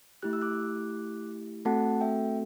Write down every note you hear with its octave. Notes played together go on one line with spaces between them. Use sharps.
A3 E4 G4 F#6
E6
D6 F#6
A3 C4 F#4 A4 F#5 A5
E5 G5